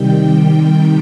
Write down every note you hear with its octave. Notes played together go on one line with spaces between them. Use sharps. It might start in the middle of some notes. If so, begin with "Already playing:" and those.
Already playing: C3 D#3 G3 G5
G5
G5